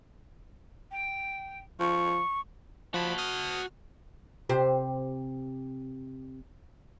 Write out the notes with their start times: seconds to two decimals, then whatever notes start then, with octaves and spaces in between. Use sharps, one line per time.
0.92 G5
1.80 F3 C#6
2.94 F3 F#4 A5 B5
3.18 D#6 F6
4.49 C3 G4 C5